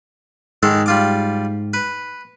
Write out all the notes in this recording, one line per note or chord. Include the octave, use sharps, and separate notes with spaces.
G#2 D#3 G#3 A4
G3 F4 D6
B4